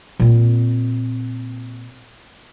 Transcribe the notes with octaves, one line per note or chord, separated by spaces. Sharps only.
A#2 C4